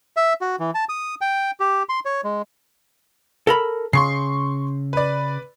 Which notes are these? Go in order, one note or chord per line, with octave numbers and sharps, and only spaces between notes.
E5
F#4
E3
A5
D#6
G5
G4
C6
C#5
G#3
A4 A#4 B5
C#3 C6 C#6 C7
B4 D5